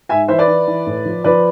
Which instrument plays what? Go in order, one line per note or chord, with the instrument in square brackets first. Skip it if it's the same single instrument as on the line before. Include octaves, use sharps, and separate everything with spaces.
[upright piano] G#2 E5 G#5
E3 C5 E5
B4 D5
E3
E3
A2
F3
F3 B4 D5